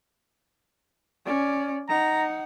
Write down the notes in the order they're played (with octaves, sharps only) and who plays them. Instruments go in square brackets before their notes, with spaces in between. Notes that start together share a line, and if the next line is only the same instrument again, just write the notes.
[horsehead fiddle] C#4 D5
[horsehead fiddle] D#4 F#5 [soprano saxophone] A#5